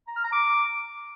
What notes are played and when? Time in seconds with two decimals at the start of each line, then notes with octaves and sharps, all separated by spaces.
0.08 A#5
0.16 F6
0.24 A#5
0.32 D6